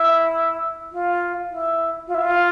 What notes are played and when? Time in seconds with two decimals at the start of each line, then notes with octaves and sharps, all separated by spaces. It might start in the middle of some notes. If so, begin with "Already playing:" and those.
Already playing: E4
0.92 F4
1.50 E4
2.07 F4
2.14 E4
2.22 F4